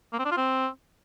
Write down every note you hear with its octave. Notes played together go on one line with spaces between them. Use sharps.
A#3
C4
D4
F4
C4